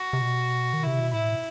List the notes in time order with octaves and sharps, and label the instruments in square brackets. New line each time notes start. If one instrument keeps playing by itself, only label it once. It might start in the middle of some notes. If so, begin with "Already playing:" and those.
Already playing: [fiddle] F#4
[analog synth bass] C3
B2
D#3
[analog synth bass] C3 [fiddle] E4
[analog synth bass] B2
[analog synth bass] A2 [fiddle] E4